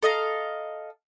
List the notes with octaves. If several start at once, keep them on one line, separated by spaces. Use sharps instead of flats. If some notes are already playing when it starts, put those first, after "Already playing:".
A4 D#5 F5 A#5